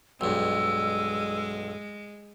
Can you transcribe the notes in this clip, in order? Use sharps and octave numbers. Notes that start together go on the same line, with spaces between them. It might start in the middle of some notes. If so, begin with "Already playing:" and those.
B1 G2 G#3 E6